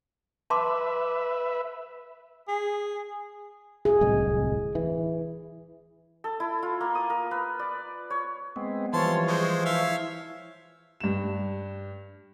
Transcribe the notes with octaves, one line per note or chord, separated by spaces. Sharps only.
B4 E5 A5 C6 D6
G#4
G#4
D1 C2 G#3
E3
A4
E4
F4
A#3
D#6
A#4
B4
D5
C#5
G#3 B3 C4
E3 F3 G3 C#5 A5 C6
G#3 C5
E4 C#5 E5 F5
G2 E7